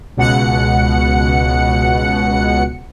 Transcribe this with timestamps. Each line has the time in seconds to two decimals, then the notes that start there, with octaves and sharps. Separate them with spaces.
0.17 C#2 B2 F#5 C#7